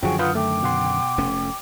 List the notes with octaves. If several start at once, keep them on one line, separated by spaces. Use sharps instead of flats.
F#2 D3 D#3 F3 F#4 G#4 G5 C#6
F4 B4 F#5 D#6 F6 G6
A3 G5 D6
B2 F#5 C6
F1 A3 C#4